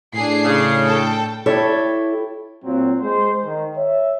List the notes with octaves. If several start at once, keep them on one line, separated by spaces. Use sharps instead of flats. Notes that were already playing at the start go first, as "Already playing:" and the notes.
A2 D4 G#4 C7
C#3
A4 G5
E4 G4 A4 C#5
A#2 F#3 C4
G#3 C5
D#3
C#5 E5